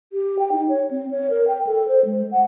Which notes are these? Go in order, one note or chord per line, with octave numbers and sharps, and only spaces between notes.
G4
G5
D#4
C#5
C4
C#5
A#4
G5
A4
C5
G#3
F#5